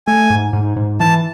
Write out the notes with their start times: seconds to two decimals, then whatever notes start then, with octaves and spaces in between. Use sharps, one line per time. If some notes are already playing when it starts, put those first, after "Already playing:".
0.07 A3 G#5
0.30 G#2
0.53 G#2
0.76 G#2
1.00 E3 A5